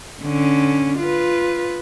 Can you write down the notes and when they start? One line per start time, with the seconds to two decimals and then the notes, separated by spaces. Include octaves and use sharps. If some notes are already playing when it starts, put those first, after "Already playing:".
0.23 D3 C#4
0.99 F4 B4